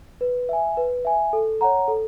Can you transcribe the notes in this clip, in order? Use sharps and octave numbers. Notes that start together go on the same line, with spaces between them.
B4
E5 G#5
B4
E5 G#5
A4
C#5 F#5 A#5
A4